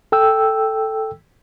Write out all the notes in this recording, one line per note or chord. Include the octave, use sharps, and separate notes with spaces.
A4 G5 E6